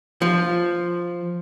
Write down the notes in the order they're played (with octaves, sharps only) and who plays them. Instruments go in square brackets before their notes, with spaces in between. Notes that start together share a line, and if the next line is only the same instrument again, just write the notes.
[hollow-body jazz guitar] F3